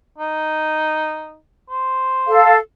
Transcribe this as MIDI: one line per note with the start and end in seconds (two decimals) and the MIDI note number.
0.18 1.37 63
1.69 2.52 72
2.27 2.56 69
2.27 2.56 77